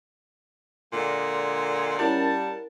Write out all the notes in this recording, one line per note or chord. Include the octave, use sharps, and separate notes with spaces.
A#2 D3 G#3
G3 C#4 E4 A#4 F#5 A5